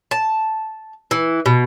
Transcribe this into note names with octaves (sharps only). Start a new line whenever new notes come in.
A5
E3
B2